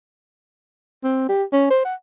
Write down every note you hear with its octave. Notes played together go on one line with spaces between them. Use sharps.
C4
G4
C#4
C5
F#5